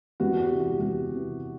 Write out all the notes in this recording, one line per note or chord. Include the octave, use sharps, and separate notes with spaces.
E2 F#4
G4
C3 E3
G4
E2 G4
C3 E3